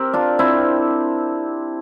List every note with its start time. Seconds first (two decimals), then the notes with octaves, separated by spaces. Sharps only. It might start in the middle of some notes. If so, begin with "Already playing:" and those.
Already playing: C4 G4 A#4
0.13 D4 F4
0.39 C4 E4